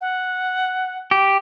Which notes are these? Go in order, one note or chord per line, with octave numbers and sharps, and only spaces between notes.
F#5
G4